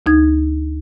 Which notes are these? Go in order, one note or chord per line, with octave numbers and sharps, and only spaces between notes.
D2 D#4 G#6